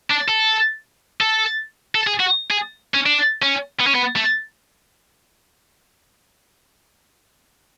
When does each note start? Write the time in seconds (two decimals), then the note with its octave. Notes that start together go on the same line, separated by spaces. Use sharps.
0.10 D4
0.28 A4
1.21 A4
1.95 A4
2.07 G#4
2.20 F#4
2.50 G#4
2.94 C#4
3.06 D4
3.42 C#4
3.80 B3
3.87 C#4
3.95 B3
4.16 A3